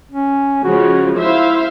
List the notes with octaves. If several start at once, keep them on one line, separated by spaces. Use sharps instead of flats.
C#4
C#3 F3 G#3 F#4
E4 C5 E5 F5